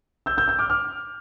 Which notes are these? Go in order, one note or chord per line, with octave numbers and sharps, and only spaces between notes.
E6 G6
E6 G6
E6 G6
D6 F6
D6 F6